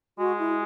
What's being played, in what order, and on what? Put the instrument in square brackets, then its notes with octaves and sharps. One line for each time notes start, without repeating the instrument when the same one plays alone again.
[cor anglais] G#3 [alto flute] F#4
[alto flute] E4